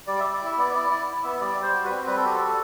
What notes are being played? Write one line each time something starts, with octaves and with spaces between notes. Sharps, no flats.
G3 D5
G3 E5
D5
E4 E5
B3 D5
E4 D5
E4 D5
E4
B3 E5
G3 D5
G3 C5
F#4
B4
C4
G3 B4
A4
F#4 G4
A4
G3